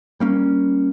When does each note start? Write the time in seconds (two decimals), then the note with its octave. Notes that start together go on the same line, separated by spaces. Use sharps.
0.20 G3 A#3 C#4